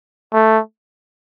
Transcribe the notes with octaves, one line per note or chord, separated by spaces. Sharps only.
A3